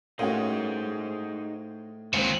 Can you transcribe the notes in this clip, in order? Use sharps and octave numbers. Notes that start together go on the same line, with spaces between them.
A2 A#3 C#4 D#4 F#4 G#4 C5
C#2 D#3 A#3 C4 F#4 C5